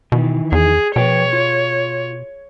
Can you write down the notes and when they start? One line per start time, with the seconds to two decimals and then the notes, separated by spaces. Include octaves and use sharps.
0.12 B2 D#3 E3
0.52 E2 G#4
0.96 B2 F3 B4 C#5 G5
1.33 F4